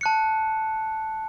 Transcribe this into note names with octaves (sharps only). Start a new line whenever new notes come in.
A5 F#6 C#7